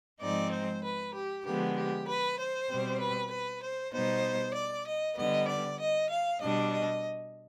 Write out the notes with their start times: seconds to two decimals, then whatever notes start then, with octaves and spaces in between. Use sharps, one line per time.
0.21 G#2 F3 G#3 C4 D#4 D5
0.52 C5
0.83 B4
1.14 G4
1.45 D3 F3 G#3 B3 G4
1.77 G4
2.07 B4
2.38 C5
2.69 B2 G3 C4
2.99 B4
3.30 B4
3.62 C5
3.93 B2 G3 B3 D#4 C5
4.55 D5
4.85 D#5
5.17 D3 G3 B3 D#5
5.48 D5
5.80 D#5
6.10 F5
6.41 B2 G3 D4 D#5
6.72 D#5